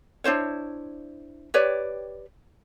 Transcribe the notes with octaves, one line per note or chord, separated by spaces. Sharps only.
D4 E4 C5 C#5
G4 B4 C#5 D5